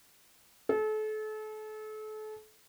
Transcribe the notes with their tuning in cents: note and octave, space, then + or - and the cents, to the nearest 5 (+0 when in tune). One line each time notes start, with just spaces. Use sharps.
A4 -35